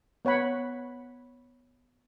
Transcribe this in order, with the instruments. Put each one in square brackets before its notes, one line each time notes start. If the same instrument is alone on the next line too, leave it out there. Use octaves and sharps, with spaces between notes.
[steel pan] B3 C#5 F#5 B5